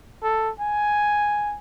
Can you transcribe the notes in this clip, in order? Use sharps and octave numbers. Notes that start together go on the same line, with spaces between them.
A4
G#5